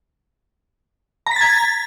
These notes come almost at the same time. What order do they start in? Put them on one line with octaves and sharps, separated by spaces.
A#5 B6 A6 G#6